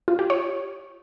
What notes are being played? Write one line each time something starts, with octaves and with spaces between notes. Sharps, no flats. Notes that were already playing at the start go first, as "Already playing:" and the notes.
F4
G4
C#5